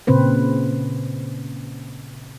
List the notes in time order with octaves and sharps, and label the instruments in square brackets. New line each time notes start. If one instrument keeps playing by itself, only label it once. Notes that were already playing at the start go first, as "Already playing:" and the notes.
[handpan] A#2 C#3 C4 B4 C5